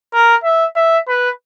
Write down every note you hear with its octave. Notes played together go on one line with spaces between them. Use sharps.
A#4
E5
E5
B4